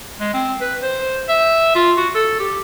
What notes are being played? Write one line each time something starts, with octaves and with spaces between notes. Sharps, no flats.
G#3
C4
B4
C5
E5
F4
F#4
A4
G4